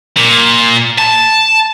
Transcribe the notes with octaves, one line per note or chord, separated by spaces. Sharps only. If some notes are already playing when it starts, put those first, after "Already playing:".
A#2
A5